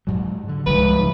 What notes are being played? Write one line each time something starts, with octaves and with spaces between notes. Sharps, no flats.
G#2 F#3
D3
C#2 G#2 F3 G3 B4